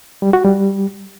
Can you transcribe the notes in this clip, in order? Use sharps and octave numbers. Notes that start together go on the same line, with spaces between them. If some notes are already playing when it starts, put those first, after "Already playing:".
G3
F#4
G3